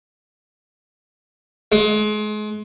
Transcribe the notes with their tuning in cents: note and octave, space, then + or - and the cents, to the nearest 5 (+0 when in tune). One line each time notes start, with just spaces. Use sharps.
G#3 +35